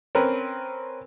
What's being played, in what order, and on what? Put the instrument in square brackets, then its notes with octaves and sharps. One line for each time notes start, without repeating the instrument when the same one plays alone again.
[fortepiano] C4 C#4 A#4 B4